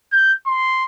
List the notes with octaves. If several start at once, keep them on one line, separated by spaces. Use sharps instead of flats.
G6
C6